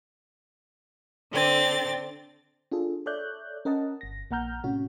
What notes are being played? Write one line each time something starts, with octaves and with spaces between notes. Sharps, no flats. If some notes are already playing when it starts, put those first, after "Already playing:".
D3 C4 A6
D4 F4 G#4 A4
A4 C#5 D5 E5 F#6 G6
C#4 A#4 D#5 F#5 A5
G1 A#6
A#1 A#3 F#5 A#5 F6 G6
A2 C3 C#4 F#4